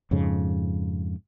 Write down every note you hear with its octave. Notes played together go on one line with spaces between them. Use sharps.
F2 G#2 C#3